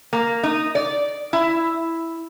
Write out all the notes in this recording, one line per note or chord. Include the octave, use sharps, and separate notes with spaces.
A#3
D#4
D5
E4